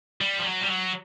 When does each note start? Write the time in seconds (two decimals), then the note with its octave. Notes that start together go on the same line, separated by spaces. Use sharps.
0.21 G3
0.39 F3
0.44 F#3
0.61 G3
0.68 F#3